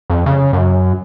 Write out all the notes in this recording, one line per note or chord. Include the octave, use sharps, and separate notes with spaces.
F2
C#3
F#2